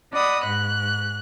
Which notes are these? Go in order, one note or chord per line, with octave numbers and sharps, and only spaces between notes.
D5 D#5 F#5 B5 D#6
G#2 F#6